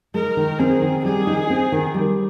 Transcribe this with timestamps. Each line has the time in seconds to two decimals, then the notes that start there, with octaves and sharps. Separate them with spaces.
0.14 G#3 A#4
0.37 D#3
0.59 C4 G#4
0.82 D#3
1.04 G3 G#4
1.27 D#4
1.50 C4
1.72 D#3
1.94 G3